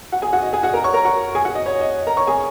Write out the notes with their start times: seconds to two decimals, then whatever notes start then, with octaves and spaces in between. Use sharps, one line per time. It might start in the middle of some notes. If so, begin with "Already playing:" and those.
0.12 F#4 F#5
0.22 G#4 G#5
0.33 F#4 F#5
0.42 D#5
0.53 G#4 G#5
0.63 F#4 F#5
0.74 A#4 A#5
0.84 C#5 C#6
0.94 A#4 A#5
1.05 F#4 F#5
1.35 G#4 G#5
1.45 F#4 F#5
1.55 D#5
1.66 C#5
1.81 D#5
2.07 A#4 A#5
2.17 C#5 C#6
2.27 G#4 G#5